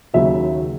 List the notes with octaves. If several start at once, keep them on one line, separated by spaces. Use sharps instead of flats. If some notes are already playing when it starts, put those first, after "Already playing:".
D#2 C#3 F#3 E5